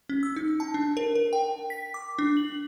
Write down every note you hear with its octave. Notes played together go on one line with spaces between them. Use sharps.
C#4
E6
D#4
A5
D4
A#4
A#4
G5
B6
D6
D4
F#7